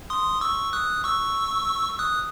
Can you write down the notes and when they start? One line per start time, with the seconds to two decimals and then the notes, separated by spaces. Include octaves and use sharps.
0.10 C6 D#6
0.41 C#6 E6
0.73 D#6 F#6
1.04 C#6 E6
1.99 D#6 F#6